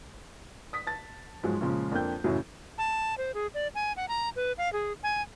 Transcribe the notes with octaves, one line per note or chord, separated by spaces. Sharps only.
D#6 B6
A5 A6
G#2 F3 F#3 G#3
A#2 C#3 F3 G#3
F2 A#3 D4 G5 G6
F#2 A2 C#3 E3 F#3
A5
C5
G#4
D5
G#5
F#5
A#5
B4
F5
G#4
G#5